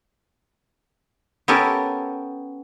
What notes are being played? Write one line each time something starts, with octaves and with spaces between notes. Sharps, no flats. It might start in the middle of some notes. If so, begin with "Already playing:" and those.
B3 C#4 G4 A4 A#4